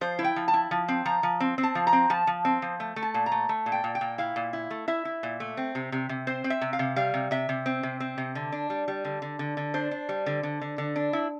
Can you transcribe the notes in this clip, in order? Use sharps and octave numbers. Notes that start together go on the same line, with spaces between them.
F3 C5
E4
G5
F3
A5
E4
F3
C4
F3 A#5
F3
C4
C4
A5
F3
A#5
C4
F3 A5
F3
C4
F3
A3
A3
A5
A#2
A#5
A3
A3
A#2
G5
A#2
G5
A#2
E4 F5
A#2
E4
A3
E4 E5
E4
A#2
A3
C4
C3
C3
C3
C4 C5
C4
E5
C3
F5
C3
G3 F5
C3
C3 E5
C3
C4
C3
C4
C3
D3
D4
G3
G3
D3
D3
D3
D3
D4 C5
D4
G3
D3
D3
D3
D3
D4
E4